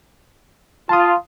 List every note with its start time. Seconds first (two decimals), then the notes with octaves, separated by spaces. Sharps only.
0.89 F4 A5 D#6